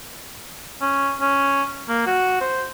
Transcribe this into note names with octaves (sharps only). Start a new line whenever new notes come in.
C#4
C#4
A#3
F#4
C5